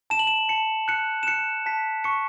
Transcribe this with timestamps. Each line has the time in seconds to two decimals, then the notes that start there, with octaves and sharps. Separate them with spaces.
0.10 A5 E7
0.19 F#7
0.27 E7
0.49 A5 C#7
0.88 F#6 C#7
1.23 E7
1.27 F#6 C#7
1.66 A5 B6
2.04 C#6 C#7